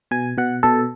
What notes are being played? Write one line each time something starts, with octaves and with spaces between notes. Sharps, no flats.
B2 G#5
B2 F#5
B2 A4